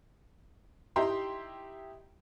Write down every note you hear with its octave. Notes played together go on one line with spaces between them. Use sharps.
D#4 E4 G4 G5 A#5 C6